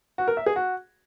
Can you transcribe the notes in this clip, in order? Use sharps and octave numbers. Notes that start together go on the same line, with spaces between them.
F#4
A#4
E5
G#4
F#4